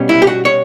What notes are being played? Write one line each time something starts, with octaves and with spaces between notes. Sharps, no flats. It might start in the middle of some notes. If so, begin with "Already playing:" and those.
Already playing: B2 G3 C#4
E4
G4
F#4
C#5